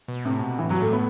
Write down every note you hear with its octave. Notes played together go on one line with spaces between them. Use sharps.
B2
A2 C3
B2
A2 E3
G2 F#3
A2 A3
B3